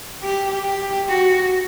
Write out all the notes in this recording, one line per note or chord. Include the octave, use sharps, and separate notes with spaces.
G4
G4
F#4